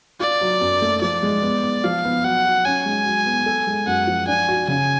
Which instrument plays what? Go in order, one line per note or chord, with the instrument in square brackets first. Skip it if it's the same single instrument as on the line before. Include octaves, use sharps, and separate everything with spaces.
[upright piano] F4 [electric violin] D5
[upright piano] F#3
F#2
A3
[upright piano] F3 [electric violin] D5
[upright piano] G#3
B3
B3
[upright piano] F3 [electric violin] F5
[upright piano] B3
[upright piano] F#3 [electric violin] F#5
[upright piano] F#3
[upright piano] C#4 [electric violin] G#5
[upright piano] G#3
F#3
B3
A4
G#3
[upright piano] F#2 [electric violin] F#5
[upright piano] F3
[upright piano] D4 [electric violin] G#5
[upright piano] F#4
[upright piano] C#3 [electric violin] G#5